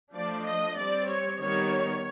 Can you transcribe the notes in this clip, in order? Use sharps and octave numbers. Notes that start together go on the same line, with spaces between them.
F3 A3 D4 D5
D#5
G3 C4 D5
C#5
D#3 G3 B3 C#5